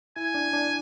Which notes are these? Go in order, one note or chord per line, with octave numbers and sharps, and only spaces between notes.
E4 G#5
D4
D4